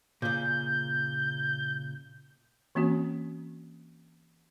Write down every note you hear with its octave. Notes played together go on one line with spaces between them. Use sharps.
A#2 C#3 G6
E3 A#3 C4 C#4 F#4